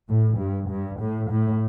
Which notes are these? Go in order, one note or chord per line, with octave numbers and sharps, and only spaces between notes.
A2
G2
G2
A2
A2